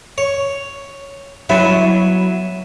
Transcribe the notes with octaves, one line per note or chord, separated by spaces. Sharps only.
C#5
F#3 B3 E4 E5 G#5